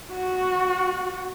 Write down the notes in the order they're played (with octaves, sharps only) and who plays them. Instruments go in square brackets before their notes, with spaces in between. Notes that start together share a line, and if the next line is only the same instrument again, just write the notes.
[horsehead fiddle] F#4